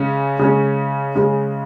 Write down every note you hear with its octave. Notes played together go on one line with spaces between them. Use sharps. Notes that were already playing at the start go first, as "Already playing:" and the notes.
Already playing: C#3 G#3 C#4
C#3 G#3 C#4
C#3 G#3 C#4